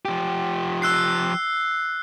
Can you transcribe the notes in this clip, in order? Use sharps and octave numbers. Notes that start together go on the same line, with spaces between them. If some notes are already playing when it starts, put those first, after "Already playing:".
F3 G4
E6 F#6 C7